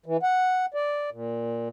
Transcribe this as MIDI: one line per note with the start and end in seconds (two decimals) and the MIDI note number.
0.06 0.17 52
0.23 0.66 78
0.74 1.10 74
1.12 1.69 46